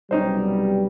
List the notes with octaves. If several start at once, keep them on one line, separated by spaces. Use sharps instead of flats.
B1 C3 G3 C#4 D#4 C5